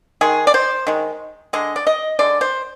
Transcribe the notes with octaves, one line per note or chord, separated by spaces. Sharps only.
D#3 G#3 G#4
D5
C5
D#3 G#3
D3 G#3 D#5
D5
D#5
D3 G#3 D5
C5